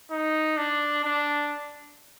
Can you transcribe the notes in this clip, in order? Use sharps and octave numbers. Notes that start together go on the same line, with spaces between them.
D#4
D4
D4